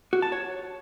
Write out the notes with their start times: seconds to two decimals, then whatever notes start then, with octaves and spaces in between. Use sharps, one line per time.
0.13 F#4
0.22 A5
0.32 C#5